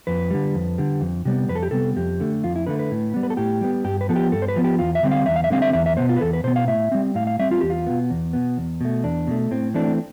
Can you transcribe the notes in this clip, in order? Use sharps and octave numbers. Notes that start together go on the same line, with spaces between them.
F2 B4
D3 G3
F2
D3 G3
F2
C3 G3 B3
F2 B4
A4
G4
C3 G3 B3 A4
F2 G4
D3 A3
F2 F4
E4
D3 A3 B4
B4
A2
G3 B3
B4
A4
A2 G4
G3 B3
G2 G4
B4
F3 B3 A4
G4
G2 A4
C5
B4
F3 B3
G4
E2 F4
E5
D3 G3 C4
F5
E2 E5
F5
E5
D3 G3 C4 F5
E5
E2 E5
E5
B2 B3 C5
F4
B4
E2 A4
B4
B2 B3 C5
F5
A2 E5
G3 C4
A2 F5
F5
G3 C4 E5
F4
E2 G4
F4
B2 B3
E2
B2 B3
E2
B2 A3
E2 D4
B2 A3
A2 C4
E3 A3 C4 D4